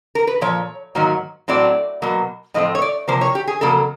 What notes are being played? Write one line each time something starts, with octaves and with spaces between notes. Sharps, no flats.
A#4
B4
A#2 F3 C#5
G#2 D#3 F#3 A#3
A2 F#3 A3 C4 D5
B2 F#3 A#3
A2 F3 A3 C4 D#5
C#5
D5
C3 F3 A#3 C5
C#5
G4
G#4
F2 C#3 F#3 A#3 A4